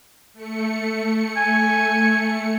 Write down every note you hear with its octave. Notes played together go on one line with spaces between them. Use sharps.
A3 C#7
G#5